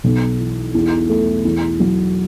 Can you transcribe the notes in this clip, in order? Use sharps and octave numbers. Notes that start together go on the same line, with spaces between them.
B1
E3
E2
A3
E2
F#3